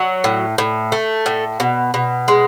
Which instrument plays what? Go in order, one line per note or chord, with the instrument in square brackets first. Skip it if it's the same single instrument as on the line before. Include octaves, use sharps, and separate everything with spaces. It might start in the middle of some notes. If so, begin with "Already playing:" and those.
Already playing: [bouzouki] F#3
A2
A2
A3
A2
B2
B2
G#3